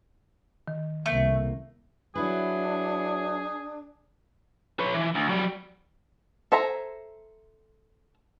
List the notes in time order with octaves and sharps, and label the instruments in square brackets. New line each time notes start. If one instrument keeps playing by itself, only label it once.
[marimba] D#3
[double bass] C2 A#3 [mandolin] A3
[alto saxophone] F#3 [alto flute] D4 [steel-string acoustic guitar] E4 B4 [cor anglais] G#4
[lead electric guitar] B4 C#5
E3
D2
F#3 G3
[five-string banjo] A4 C5 E5 G#5 A#5